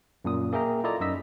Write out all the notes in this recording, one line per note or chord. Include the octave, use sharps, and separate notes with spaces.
F#2 A#2 D#6
A#3 G#4 A#4 E5 G5 A#5
E4 F4 A4 D5 D#5 A#5
F#2 D#4 D#5 E6 B6